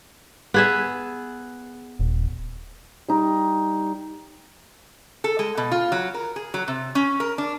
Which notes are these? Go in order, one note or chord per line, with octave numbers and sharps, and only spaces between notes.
B3 G#4 E5
D#1
G3 D#4
A4
G#3
B2
F4
F#3
A#4
G#4
F#3
C3
C#4
A#4
D4